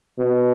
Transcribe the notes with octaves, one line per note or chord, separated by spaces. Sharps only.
B2